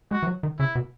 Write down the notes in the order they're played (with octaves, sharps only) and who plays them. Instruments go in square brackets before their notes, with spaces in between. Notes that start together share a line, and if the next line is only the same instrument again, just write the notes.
[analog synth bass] G#3 [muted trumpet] F#4
[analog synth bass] E3
F#3
D#3
[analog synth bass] C#3 [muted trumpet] E4
[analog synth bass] B2